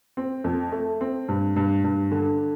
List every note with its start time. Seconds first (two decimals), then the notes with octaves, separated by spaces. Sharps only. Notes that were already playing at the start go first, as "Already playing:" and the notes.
0.17 C4
0.44 F2
0.72 A3
1.01 C4
1.28 G2
1.56 G2
1.84 G2
2.12 D3